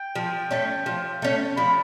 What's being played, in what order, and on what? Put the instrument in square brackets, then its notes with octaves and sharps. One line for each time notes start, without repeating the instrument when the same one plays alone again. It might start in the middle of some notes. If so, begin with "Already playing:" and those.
Already playing: [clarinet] G5
[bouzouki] F3
A3 C#4
F3
A3 C#4
[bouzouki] F3 [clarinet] B5